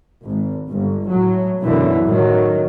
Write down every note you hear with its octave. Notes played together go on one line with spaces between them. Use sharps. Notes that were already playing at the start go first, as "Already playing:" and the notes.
G#1
G1
A2 F#3
B1 F#2 D3 E3
A1 D#3 F#3